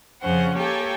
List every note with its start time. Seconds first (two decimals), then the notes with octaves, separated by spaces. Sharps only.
0.22 F2 C#3 F3 C#4 C5 F#5
0.56 A#3 G4 A4 C#5 G5 G#5